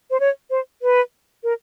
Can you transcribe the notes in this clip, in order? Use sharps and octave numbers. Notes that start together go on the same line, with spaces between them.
C5
C#5
C5
B4
A#4